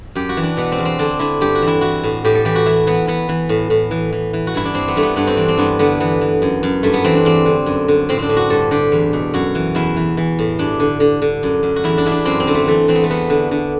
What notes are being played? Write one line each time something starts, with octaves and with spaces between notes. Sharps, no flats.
F#2 G4
F#4
E3
D4
B2 B3
C4
E2
C4
D3 D4
D3 E4
G2 G4
F#4
E3
E4
E3 F#4
A2
A2 G4
A4
E3 G4
F#4
E3 E4
E3 B3
E3 B3
E3
A2
A2
E3
E3
E3
F#4
G2 E4
D4
G2 C4
B3
G2 A3
B3
G2 B3
C4
E3 D4
C4
G2 B3
D3 B3
E3 B3
E3
F#2
F#2
G2 A3
B3
E3 C4
D4
E2 C4
D3
F#2
D3
A2 C4
C4 D4
A2
F#4
G2 A4
D3 G4
E2
B2
F#2 F#4
E3
E2 E4
E3
E3
A2
G2 D4
D3
D3
D3
F#2
F#2
F#4
E2 E4
D4
E2 E4
D4
F#2 C4
C4
D3
A3
E3 A3
E3 C4
B3
A3
E2 B3
D3
D3